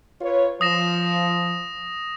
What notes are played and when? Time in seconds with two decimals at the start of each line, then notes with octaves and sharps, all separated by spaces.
0.21 F4 B4 C#5
0.61 F3 D#6 A#6 E7